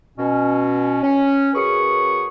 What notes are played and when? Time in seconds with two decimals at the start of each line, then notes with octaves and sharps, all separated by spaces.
0.18 B2 C#4
1.02 C#4
1.54 F#2 G#4 B4 C#6